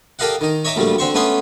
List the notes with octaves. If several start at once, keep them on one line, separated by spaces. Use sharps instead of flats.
G4 A4 A#4 D#5 F5 F#5
D#3 D#4
C#5 D#5 E5 A#5 D6
D2 A#2 F3 G3 A3
D3 C4 C5 C#6
A3 B3 C#4 C#5 C6 D#6